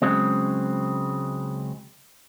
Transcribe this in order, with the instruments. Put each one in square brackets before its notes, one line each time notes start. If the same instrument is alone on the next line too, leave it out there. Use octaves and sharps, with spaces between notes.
[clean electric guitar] C#2 A2 C#3 F#3 G#3 C4